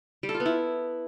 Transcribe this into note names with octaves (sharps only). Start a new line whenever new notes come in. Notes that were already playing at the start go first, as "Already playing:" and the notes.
G3
A4
F4
B3
E4